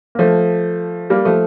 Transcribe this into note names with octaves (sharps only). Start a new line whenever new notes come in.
A#3
F3 A3
G3 A#3
F3 A3